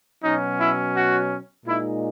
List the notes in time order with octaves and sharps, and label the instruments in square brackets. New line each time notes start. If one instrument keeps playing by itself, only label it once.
[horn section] B2 F#3 C#4 D#4
E4
F#4
A#2 G#3 D#4 E4